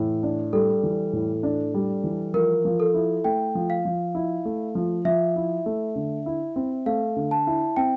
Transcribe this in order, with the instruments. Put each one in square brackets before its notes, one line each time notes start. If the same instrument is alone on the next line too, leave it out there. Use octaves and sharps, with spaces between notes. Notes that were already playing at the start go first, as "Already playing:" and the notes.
Already playing: [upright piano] A2 E3
D4
[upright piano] G3 [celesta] A4
[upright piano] E3
A2
D4
G3
E3
[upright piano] F3 [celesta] A#4
[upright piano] F3
[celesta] A4
[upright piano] E4
[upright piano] A3 [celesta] G5
[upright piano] F3
[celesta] F5
[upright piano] F3
E4
A3
F3
[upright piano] F3 [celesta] E5
[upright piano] E4
A3
D3
E4
C4
[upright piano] A3 [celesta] F5
[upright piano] D3
[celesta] A5
[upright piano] E4
[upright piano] C4 [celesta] G5